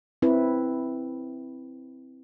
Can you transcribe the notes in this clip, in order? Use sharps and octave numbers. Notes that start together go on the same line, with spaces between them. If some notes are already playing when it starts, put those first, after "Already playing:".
C4 E4 B4